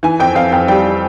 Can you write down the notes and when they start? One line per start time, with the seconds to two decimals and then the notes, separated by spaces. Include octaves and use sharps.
0.03 E3 G#5
0.19 F2 G5
0.35 F2 F5
0.52 F2 G5
0.68 G3 G5
0.83 G3